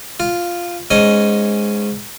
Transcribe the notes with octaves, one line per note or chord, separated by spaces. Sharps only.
F4
G#2 C#4 D#5 G#5